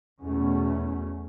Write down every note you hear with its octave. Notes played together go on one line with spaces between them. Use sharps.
E2 B2 A3 C#4